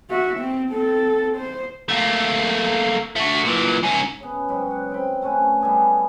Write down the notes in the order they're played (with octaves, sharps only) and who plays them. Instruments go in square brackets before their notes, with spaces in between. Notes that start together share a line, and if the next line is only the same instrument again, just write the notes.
[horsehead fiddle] F#4 E5
C4
C4 A4
C5
[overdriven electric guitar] A3 A#3
A3 F#4
A#2 E3
G#2 C#4
[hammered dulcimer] C#3 B3
G#2 F#3 G4 B5
F#5
C4 G5 B5
A3 C#4 B4 C5
G3 B3 G#4 A4